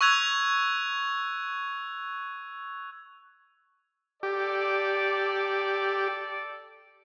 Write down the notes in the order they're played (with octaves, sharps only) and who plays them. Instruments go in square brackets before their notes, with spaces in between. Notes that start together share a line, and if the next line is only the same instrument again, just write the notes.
[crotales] C#6 E6 F#6 G#6 F7
[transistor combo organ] G4 [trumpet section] A4 D5